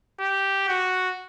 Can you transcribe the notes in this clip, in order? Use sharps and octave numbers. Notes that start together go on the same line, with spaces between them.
G4
F#4